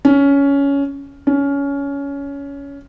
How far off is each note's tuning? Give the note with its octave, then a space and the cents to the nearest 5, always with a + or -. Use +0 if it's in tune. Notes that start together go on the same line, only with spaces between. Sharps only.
C#4 +15
C#4 +20